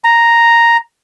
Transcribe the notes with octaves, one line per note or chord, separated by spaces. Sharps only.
A#5